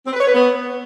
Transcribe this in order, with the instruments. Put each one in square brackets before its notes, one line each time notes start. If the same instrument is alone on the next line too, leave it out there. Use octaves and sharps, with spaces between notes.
[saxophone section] C4
B4
C#5
B4
B3